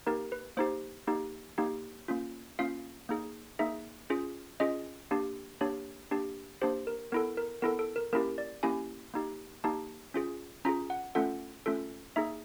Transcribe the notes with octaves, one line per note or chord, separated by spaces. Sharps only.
A#3 D#4 G4 A#4
B4
A#3 D#4 G4 C5
A#3 D#4 G4
A#3 D#4 G4
A#3 C#4 F4
A#3 C#4 F4 F5
A#3 D#4 G#4
A#3 D#4 G#4 E5
C#4 F4 G#4
C#4 F4 G#4 D#5
A#3 D4 G4
A#3 D4 G4 C#5
A#3 D4 G4
A#3 D4 G4 C5
A#4
B3 E4 A4 A#4
A#4
B3 E4 A4 A#4
A4
A#4
A#3 C#4 E4 G4 A#4
D5
A#3 C#4 E4 G4 G#5
A#3 D#4 G4
A#3 D#4 G4 A5
C#4 F4 G#4
C#4 F4 G#4 A#5
F#5
A3 C#4 F4 A4 F#5
A3 C#4 F4 A4
A#3 D#4 G#4 E5